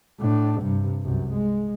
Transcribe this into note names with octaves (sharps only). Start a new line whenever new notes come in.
A2 D4
G2 C3
C2 F#2
G#3